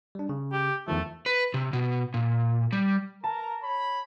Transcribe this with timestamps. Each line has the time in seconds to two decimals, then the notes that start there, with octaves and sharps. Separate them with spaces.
0.15 G3 D4
0.29 C#3
0.52 G4
0.88 E2 D#3 F3 A3
1.26 B4
1.54 C3
1.73 B2
2.14 A#2
2.73 G3
3.24 A#4 A5 A#5
3.63 C#5 B5